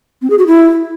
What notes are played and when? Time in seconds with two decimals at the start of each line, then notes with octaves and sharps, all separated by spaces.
0.22 C4
0.30 G#4
0.39 F#4
0.47 E4